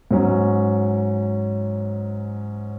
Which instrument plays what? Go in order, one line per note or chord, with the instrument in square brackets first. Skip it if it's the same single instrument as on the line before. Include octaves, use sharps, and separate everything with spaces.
[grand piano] G#2 F#3 C#4